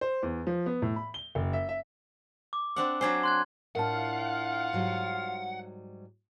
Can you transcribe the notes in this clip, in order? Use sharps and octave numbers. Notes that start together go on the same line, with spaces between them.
C5
E2
F3
B3
A2
B5
G7
F#1
E5
E5
D6
C4 D4 F#5 D6
F#3 D4 C5 G#5 G#6
C6 F#6 G#6
A2 D4 F4 A#4 F5 F#5 A5
G#2 F#3 G3